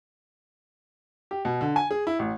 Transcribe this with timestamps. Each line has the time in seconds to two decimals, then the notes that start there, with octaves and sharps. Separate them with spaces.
1.31 G4
1.45 B2
1.61 D3
1.76 G#5
1.91 G#4
2.07 E4
2.19 A1